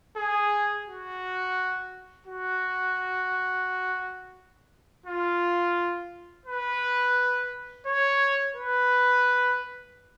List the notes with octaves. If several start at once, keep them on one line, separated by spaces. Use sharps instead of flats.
G#4
F#4
F#4
F4
B4
C#5
B4